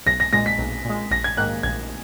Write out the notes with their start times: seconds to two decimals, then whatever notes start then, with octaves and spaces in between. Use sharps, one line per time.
0.06 B1 A#6
0.20 A#6
0.33 A#2 G#3 A#6
0.46 B6
0.58 B1
0.85 A#2 G#3
1.11 A#1 A#6
1.24 G#6
1.37 G#2 D#3 A#3 F#6
1.63 A#1 G#6